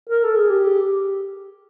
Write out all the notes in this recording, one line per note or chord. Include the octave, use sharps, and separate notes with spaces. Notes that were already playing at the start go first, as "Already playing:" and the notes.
A#4
A4
G#4
G4